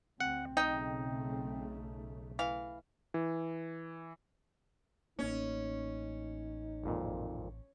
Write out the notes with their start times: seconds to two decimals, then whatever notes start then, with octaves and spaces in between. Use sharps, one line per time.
0.20 D2 C4 F#5
0.57 B1 C#3 A3 D#4 D#5 G5
2.39 E3 F5
3.14 E3
5.19 A1 A#3 C#4 D#4
6.84 G#1 F2 A#2